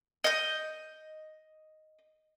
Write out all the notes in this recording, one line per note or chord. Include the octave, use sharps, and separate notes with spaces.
D#5 G6